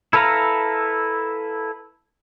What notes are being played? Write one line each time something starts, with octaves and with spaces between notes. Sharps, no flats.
E4 A4 B4 F5 A#5